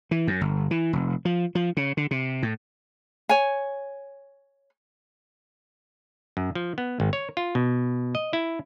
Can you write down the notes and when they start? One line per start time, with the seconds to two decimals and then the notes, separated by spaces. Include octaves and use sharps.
0.11 E3
0.27 F#2
0.41 G1
0.71 E3
0.93 F1
1.25 F3
1.55 F3
1.77 C#3
1.97 D3
2.11 C3
2.43 A2
3.29 C#5 G#5
6.37 F#2
6.55 F3
6.78 B3
7.00 G#1
7.13 C#5
7.37 F4
7.55 B2
8.15 D#5
8.33 E4